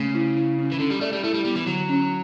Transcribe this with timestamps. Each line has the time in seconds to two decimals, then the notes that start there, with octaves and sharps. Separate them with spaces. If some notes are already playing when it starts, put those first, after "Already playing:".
Already playing: C#3 A3
0.15 E4
0.36 E4
0.58 C#4
0.72 E3
0.80 D3 C#4
0.90 G3
1.01 A3 D5
1.13 G3
1.23 A3 E4
1.34 G3
1.45 G3 B3
1.55 E3
1.67 D3 F#3
1.89 C#4